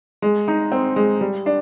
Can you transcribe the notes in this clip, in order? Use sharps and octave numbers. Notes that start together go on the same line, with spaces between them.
G#3
D#4
C4
G#3
G3
D4